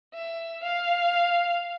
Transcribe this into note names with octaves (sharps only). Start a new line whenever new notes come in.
E5
F5